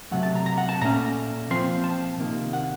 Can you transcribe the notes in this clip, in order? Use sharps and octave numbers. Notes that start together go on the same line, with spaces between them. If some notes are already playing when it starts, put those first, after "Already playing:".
C3 F#3 A3 F#5
A5
A#5
A#5
F#5
A5
A#2 A3 C#4 A#5
A#2 F3 C4 C6
A5
C3 D#3 A#3
F#5